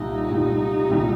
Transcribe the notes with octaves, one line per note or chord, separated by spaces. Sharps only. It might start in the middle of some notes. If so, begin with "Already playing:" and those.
Already playing: C2 A#2 G3 D#4
C2 A#2 G3
C2 A#2 G3